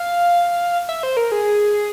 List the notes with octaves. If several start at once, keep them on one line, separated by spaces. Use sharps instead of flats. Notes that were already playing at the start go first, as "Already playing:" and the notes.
Already playing: F5
E5
C5
A#4
G#4